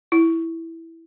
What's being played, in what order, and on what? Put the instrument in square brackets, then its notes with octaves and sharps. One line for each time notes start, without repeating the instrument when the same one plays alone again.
[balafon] E4